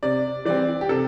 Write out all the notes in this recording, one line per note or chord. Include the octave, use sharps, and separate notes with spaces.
C3 D5
E3 G3 C4 D5
G4
C3 A4